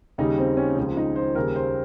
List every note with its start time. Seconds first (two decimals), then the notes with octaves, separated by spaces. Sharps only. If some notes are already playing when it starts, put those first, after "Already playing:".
0.18 D#2 C#3 G3 D#4
0.38 C4
0.57 C#4
0.77 C#2 C#3 F3
0.97 D#4
1.16 C5
1.35 D#2 C#3 G3 A#4
1.56 C5